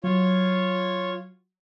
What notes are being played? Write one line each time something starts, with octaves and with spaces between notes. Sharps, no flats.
F#3 F4 C#5